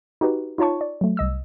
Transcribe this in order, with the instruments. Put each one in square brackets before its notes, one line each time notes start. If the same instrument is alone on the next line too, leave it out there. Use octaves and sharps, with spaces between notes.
[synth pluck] D#4 F#4 G4 B4
D#4 F4 C#5 A5 C#6
D5
F#3 A3
C2 D#5 E6